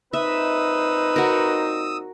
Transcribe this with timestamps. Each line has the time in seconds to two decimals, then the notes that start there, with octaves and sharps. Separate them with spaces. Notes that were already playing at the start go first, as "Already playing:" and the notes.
0.13 A#2 C4 D#4 B4 E5 D#6 E6
1.16 F#4 A#4